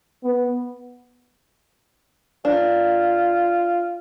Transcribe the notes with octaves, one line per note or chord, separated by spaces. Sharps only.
B3
D4 F4